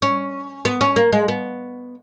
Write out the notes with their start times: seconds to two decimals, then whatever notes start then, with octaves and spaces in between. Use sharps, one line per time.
0.02 C#4
0.65 B3
0.81 C#4
0.96 A#3
1.12 G#3
1.28 B3